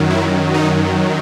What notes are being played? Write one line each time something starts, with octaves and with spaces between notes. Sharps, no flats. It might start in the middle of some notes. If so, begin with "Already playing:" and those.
Already playing: F#2 D#3 F#3
E4
D#4